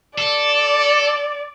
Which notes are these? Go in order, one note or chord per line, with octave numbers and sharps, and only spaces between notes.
A4 D5